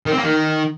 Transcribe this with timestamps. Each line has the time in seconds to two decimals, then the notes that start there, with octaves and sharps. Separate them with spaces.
0.06 D#3
0.12 C4
0.18 A#3
0.23 D#3